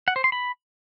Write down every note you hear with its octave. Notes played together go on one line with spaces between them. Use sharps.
F#5
C5
C6
B5